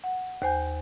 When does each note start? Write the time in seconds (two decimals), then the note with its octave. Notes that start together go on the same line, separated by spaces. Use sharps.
0.04 F#5
0.42 D#2 C5 G#5 G6